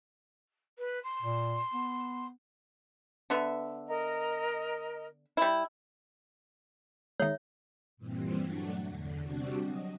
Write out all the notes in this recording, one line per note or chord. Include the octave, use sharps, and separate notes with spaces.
B4
C6
A#2
B3
D3 B3 E5
A#4 D#5
G3 E4
D#3 G#3 C#5 E5
G2 A#2 E3 G3 C4
F#3 A3 D4 F#4
E2 D3
C3 G3 C4 D4 F#4
F#3 D#5